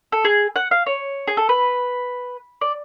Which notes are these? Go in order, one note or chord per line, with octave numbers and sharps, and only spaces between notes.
A4
G#4
F#5
F5
C#5
G#4
A4
B4
D5